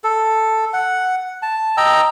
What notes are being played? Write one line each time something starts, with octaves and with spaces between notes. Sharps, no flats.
A4
F#5
A5
D#5 G5 A#5 E6